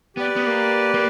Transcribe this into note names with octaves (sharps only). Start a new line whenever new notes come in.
B3 G4 B4 D5
B3
A#3
A#3